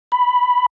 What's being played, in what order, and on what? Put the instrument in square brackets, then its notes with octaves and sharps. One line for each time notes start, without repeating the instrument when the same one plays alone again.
[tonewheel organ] B5